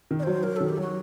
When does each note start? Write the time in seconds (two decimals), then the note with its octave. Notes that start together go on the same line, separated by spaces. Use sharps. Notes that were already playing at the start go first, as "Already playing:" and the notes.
0.11 D#3
0.19 D5
0.23 F#3 C5
0.43 F#3 A#4
0.56 D#3 A4
0.69 G4
0.78 F#3 F#4